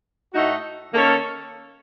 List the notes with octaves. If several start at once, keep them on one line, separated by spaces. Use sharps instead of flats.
A2 A3 D#4 F#4
D#3 A#3 C#4 A4